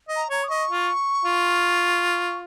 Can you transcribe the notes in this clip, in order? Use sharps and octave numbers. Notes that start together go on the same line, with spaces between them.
D#5
A#5
C#5 A#5
D#6
D#5 C#6
F4
F4